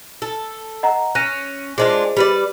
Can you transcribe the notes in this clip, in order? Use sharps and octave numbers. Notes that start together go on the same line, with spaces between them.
A4
D#5 F#5 A#5
C#4 F#6 A#6 D#7
G#3 D4 F4 G#4 C5 D#5
G3 B4 D5